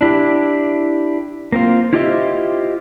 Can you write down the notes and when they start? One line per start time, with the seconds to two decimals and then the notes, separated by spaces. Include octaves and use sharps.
0.01 D4 E4 G4
1.52 A#3 C4 F4
1.93 E4 F4 G4 C5 D#5 E5